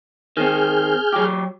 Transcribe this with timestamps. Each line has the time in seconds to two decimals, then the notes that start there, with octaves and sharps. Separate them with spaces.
0.37 D#3 C4 G#4 F6 G6
1.13 F#3 G4